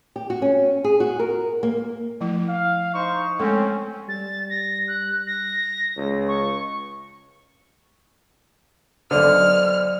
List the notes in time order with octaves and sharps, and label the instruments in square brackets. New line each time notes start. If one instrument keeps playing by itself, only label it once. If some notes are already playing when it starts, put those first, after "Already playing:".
[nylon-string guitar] G4
F#4
C#4
G#4
F#4
A#4
A#3
[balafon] F3 A3 E4
[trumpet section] F5
D#4 C5 C#6
[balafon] G#3 A3 A4 [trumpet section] C4 C#4
[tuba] G3 [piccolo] A6
[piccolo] A#6
F#6
A#6
[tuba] C#2
[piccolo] C#6
[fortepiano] B1 D3 [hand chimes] C5 D5 [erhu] F6